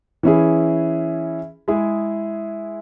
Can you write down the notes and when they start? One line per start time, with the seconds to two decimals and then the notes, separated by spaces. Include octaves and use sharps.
0.23 E3 C#4 E4 G#4
1.68 G#3 E4 G#4